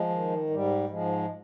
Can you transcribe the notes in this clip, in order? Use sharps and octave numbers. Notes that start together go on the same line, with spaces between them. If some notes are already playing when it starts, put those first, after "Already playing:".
Already playing: F3 G#3
D#3
G#2 G3
G#2 F3 G#3